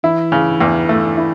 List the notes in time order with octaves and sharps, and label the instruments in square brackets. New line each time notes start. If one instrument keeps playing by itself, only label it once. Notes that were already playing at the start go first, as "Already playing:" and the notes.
[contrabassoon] E3 [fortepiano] E4
[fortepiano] C#3
E2
A3
E4